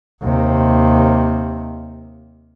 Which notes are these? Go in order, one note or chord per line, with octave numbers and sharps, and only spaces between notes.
D#2 C3